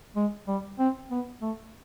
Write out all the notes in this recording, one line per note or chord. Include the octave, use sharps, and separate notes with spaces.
G#3
G3
C4
B3
A3